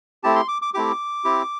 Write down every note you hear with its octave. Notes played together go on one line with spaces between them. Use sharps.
A3 C4 E4 G4 A5
C6
D6
D6
A3 C4 E4 G4 D6
C4 E4 G4